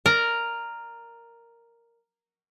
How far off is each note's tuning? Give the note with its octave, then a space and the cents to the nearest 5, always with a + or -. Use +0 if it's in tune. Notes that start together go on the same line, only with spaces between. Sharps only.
A#4 +0 D5 +30